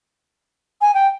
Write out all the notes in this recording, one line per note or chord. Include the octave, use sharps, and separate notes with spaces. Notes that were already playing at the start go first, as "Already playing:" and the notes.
G#5
G5